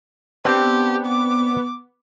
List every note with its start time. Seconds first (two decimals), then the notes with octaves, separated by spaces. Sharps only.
0.45 B3 C4 D4 G4 G5
1.06 D6